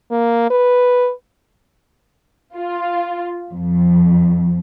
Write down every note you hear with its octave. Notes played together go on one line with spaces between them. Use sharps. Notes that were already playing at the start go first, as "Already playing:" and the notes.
A#3
B4
F4
F2